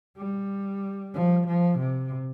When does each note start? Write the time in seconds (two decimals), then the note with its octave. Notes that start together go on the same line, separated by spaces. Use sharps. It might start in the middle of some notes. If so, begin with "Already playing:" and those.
0.17 G3
1.14 F3
1.48 F3
1.79 C3